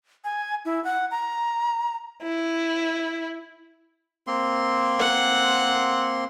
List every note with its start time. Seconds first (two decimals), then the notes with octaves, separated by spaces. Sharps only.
0.24 G#5
0.65 E4
0.84 F#5
1.11 A#5
2.22 E4
4.27 A#3 C4 C6
4.99 F#5